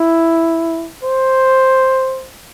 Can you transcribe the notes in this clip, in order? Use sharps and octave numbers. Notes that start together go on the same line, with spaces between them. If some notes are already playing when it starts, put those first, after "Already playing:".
Already playing: E4
C5